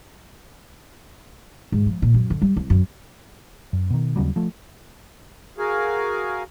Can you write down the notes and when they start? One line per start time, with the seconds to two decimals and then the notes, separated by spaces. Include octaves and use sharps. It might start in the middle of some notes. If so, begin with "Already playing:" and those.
1.72 G#2
1.86 F3
2.02 A#2
2.14 F#2
2.30 D3
2.42 G3
2.57 C2
2.70 F#2
3.73 F#2
3.90 B2 D#3
4.16 D#2 C#3 F#3 G3
4.36 F3 A3
5.58 F#4 G#4 A#4 F5 G#5